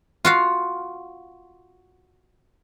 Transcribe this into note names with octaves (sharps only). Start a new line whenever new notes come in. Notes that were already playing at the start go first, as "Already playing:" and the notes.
F4 F#4 F5